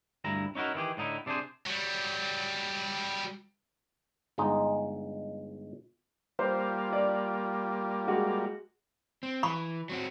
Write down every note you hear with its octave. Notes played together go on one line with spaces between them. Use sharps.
D2 G2 E4 A#5
C#4 D#4 E4 F#4 A#4
D#3 E3 E4 G4 G#4
A2 D3 D#4 E4
C3 D4 D#4 G#4 C5
F#3 G3
G1 G#3 D#4 D#5
G3 A#3 F4 C5
D5
G#3 F#4
C4
E3 B5 C#6
F#3 C4 F#4